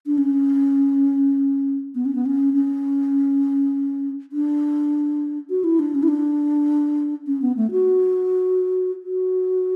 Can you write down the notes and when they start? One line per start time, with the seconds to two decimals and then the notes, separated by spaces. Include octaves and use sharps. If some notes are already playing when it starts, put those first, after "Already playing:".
0.06 D4
0.18 C#4
1.95 B3
2.05 C#4
2.15 B3
2.26 C#4
2.54 C#4
4.32 D4
5.50 F#4
5.64 E4
5.79 D4
5.95 C#4
6.03 E4
6.08 D4
7.27 C#4
7.42 B3
7.57 A3
7.71 F#4
9.04 F#4